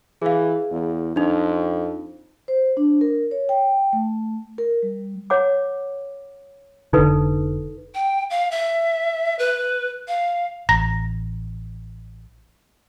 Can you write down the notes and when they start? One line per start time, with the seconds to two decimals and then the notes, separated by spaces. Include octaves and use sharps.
0.22 E3 G#4 F5
0.71 E2
1.16 F2 D4 D#4
2.48 C5
2.77 D4
3.01 A#4
3.31 C#5
3.49 G5
3.93 A3
4.58 A#4
4.83 G3
5.30 C#5 F#5 D6
6.93 F1 D3 D#4 A4 B4
7.94 G5
8.30 F5
8.51 E5
9.39 B4
10.08 F5
10.69 A1 A#5 A#6